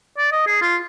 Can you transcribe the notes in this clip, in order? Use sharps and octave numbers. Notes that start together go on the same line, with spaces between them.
D5
D#5
G#4
F4